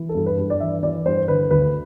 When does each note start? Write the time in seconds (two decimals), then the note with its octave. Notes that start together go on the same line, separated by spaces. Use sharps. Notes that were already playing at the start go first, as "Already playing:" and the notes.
Already playing: E3
0.09 A4
0.15 G2
0.26 B4
0.37 G2
0.50 D5
0.60 E3 E5
0.83 E3 D5
1.06 G2 C5
1.28 D3 B4
1.51 D2 B4